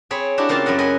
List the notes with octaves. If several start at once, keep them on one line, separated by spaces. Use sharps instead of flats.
C4 G#4 C#5 B5
D4 E4 F#4 G4
C#3 A#3 C4 F4 A5
F#2 E4 D#5 F#5
B4 D#5 F#5 G#5